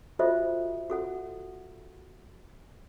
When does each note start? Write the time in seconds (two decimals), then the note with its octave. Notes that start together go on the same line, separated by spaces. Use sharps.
0.19 F4 F#4 A4 C5 D#5 E5
0.90 F#4 A4 F#5